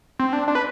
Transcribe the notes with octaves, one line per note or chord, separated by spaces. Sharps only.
C4
D4
D4
B4